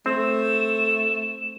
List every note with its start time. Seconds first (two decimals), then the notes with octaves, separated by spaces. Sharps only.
0.06 A3 C4 E7